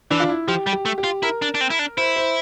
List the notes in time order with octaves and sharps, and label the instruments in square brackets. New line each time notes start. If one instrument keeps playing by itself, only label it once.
[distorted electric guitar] E3 [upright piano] D4
[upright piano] F4
E4
[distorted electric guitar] F3 [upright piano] G4
[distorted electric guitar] G3
[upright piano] G4
[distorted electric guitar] A3
[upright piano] G4
[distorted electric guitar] F4
[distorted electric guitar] E4 [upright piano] A#4
[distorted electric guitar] D4
D4
C4
E4
D4
[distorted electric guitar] E4 [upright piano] C5
[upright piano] C5